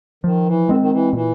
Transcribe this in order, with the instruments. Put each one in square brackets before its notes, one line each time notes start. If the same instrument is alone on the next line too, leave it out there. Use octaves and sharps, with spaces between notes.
[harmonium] D#3 [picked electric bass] F3
[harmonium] E3
[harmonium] D#3 [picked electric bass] G#3 C4
[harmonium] D#3
E3
[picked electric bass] A#2 [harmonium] E3